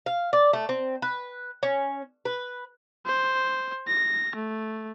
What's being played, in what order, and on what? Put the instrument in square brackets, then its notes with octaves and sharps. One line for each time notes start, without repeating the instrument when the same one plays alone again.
[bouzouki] F5
D5
A3
C4
B4
C#4
B4
[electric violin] C5
A#6
A3